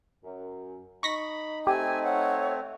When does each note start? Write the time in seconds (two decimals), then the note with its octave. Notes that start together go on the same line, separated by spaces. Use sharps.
0.24 F#2
1.03 D#4 B5 C#6 A#6 B6
1.67 A3 C4 G4 G#5
2.03 C#5 F#5